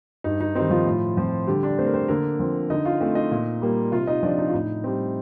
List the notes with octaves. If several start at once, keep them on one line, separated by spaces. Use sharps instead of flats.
G2 D#4
D#4
D#3 G3 C4 D#4
F3 F4
A2
F3 C4
D3 G3 G4
D4 D5
A3 C4 C5
A#4
C4 C5
D3 A#3 A#4
F3 C4
D3 D#4 D#5
F4 F5
A3 C4 C5
D#4 D#5
A#2
G3 A#3
C3 F4 F5
D#4 D#5
F3 C4 D4 D5
D#4
F4
A2 D#4
G3 C4